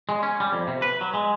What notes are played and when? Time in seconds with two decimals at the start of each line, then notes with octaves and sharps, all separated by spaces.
0.09 G#3
0.23 C#4
0.40 G3
0.52 F2
0.67 C3
0.82 B4
1.01 F#3
1.14 G#3